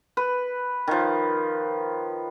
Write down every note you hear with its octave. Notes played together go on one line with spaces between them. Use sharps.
B4
D#3 F3